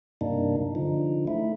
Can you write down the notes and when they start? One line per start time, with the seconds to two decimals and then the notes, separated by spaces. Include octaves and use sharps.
0.21 G2 C3 A#3 D4 D#4
0.75 D3 F3 D#4
1.27 A3 E4